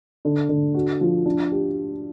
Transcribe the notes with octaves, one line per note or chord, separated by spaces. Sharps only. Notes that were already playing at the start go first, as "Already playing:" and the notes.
D3
D3
F#4
F3
D4
G4